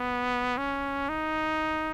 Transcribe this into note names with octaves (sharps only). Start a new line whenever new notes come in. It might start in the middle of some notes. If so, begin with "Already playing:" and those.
Already playing: B3
C#4
D#4